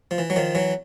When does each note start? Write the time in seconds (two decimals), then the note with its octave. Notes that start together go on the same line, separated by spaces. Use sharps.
0.11 F3
0.18 E3
0.30 F#3
0.36 D#3 F3
0.55 E3 F#3